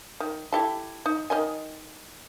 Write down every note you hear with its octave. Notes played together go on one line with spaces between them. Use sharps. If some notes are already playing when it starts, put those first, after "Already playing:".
D#3
E4 G4 A4
D#4
D#3 D#5 G#5